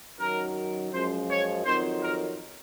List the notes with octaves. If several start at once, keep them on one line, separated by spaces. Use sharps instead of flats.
F#2 D#3 F#3 A#4
F#2 F3 G#3 C5
C#5
F2 D#3 F#3 C5
A#4